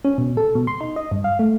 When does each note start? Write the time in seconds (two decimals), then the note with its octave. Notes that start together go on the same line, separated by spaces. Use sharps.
0.05 C#4
0.18 B2
0.37 A4
0.55 B2
0.67 C6
0.81 D#4
0.96 D#5
1.11 G2
1.24 F5
1.39 A3